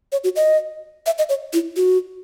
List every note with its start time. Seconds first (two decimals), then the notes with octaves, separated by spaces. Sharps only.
0.12 C#5
0.24 F#4
0.36 D#5
1.06 E5
1.18 D#5
1.29 C#5
1.53 E4
1.76 F#4